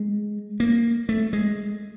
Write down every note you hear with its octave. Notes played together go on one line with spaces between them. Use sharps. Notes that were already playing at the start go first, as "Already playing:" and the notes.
Already playing: G#3
A#3
A3
G#3